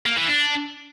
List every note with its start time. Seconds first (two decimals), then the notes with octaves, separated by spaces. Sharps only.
0.06 A#3
0.17 E3
0.29 D4